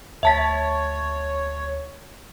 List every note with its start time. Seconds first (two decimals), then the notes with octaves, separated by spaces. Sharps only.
0.23 D2 C#5 E5 A5 A6 B6